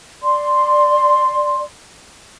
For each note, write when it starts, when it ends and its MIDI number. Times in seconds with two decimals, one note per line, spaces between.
0.22 1.63 74
0.22 1.63 84